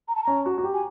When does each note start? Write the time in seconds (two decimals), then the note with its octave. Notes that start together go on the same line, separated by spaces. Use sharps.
0.08 A#5
0.16 A5
0.24 C#4 A#5
0.46 F#4
0.58 F#4
0.63 G4
0.74 G#5